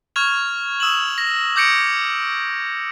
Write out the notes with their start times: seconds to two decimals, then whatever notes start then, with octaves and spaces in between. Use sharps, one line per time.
0.16 C#6 F6 G#6 F7
0.80 D#6 E6 E7 F#7
1.18 A#6
1.56 D6 G6 A#6 C#7 D7